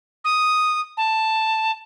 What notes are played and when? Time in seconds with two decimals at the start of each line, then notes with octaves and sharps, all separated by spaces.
0.25 D#6
0.97 A5